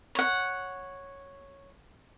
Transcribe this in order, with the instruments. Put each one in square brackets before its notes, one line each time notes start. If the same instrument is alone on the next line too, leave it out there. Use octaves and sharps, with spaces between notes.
[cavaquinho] C#5 F#5